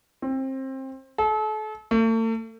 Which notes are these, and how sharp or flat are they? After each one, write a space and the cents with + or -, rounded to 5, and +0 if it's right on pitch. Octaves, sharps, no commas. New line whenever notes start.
C4 +25
A4 -35
A3 +40